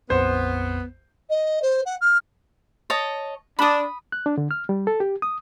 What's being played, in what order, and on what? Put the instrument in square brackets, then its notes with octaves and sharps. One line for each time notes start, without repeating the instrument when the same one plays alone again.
[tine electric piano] A#1 F2 [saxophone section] B3 [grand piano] C5
[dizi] D#5
C5
F#5
F6
[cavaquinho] C#5 D#5 A5
[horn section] D4 [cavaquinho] B5 D#6
[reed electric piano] F#6
D4
D3
F6
G3
A4
G4
D#6